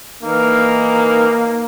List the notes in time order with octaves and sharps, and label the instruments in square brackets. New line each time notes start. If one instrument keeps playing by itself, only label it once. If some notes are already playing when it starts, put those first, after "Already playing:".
[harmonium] E3 D#4 A#4 [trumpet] A#3